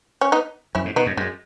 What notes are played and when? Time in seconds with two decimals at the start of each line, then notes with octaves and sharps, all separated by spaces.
0.21 C#4
0.32 B3 D#4
0.75 F#2 C#4 E4
0.85 G#2
0.96 B2 B3 D#4
1.06 F#2
1.17 F#2 G#3